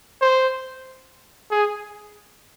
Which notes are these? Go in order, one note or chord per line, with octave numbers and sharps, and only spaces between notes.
C5
G#4